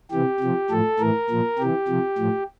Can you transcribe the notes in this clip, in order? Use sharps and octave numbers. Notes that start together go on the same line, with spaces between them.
C3 E3 G4
C3 F3
A2 F3 A4
A2 E3 A#4
A#2 F3
C3 E3 G4
C3 F3
A2 F3